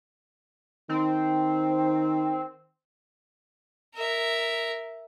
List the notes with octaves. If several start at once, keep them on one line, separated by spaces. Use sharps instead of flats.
D#3 C4
A#4 E5